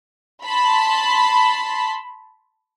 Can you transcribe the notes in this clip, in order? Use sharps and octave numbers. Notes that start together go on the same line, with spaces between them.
A5 B5 C6